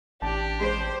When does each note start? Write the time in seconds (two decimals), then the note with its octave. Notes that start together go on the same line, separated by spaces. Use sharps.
0.22 A1 D4 G4 A5
0.60 G#3 C5